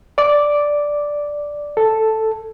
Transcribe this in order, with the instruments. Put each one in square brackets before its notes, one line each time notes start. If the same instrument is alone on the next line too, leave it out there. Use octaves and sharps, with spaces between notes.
[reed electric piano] D5 D6
A4